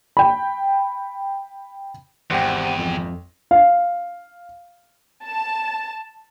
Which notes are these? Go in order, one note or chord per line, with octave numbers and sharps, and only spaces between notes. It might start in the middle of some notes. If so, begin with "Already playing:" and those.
G5 B5
G#1 E2 G4 C5 F#5 G5
F2
F5
A5